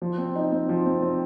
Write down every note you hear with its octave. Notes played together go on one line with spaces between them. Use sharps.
F3
C4
D#4
C4
F3
C4
C4